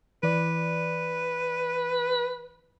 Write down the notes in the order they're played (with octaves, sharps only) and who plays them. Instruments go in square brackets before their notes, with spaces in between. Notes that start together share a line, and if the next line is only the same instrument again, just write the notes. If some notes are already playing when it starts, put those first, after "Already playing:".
[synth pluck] E3 D5 [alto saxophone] B4